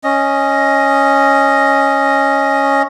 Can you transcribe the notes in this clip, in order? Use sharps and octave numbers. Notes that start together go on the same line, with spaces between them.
C#4 D#5